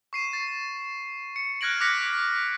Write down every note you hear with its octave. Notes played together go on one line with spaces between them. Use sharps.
C#6 C7 D#7
A6
C#7
F6 F#6 G#6 A#6 D7 F#7
D6 F#6 A#6 B6 C#7